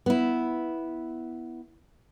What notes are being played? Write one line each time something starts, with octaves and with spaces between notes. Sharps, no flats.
B3 E4